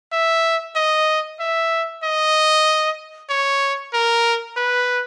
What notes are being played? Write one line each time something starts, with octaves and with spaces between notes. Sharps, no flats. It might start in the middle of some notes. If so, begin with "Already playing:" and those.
E5
D#5
E5
D#5
C#5
A#4
B4